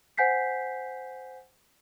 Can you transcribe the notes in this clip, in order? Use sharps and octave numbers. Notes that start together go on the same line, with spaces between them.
C5 F#5 G#5 G6 B6 C7